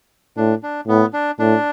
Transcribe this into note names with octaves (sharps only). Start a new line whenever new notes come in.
A2 D4
D4
A2 B3
D4
A2 D4